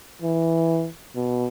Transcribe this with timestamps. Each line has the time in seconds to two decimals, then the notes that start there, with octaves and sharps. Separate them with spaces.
0.22 E3
1.16 B2